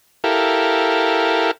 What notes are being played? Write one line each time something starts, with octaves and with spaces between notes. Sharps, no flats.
E4 G4 A4 A#4 F5